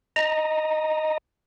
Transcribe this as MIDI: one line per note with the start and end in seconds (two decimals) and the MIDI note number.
0.16 1.18 75
0.16 1.18 82